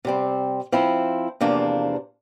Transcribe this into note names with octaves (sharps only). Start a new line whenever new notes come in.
C3 G3 C4
F3 C4 E4
E2 C3 F3 A#3 D4